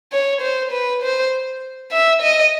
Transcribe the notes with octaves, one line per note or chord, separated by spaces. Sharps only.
C#5
C5
B4
C5
E5
D#5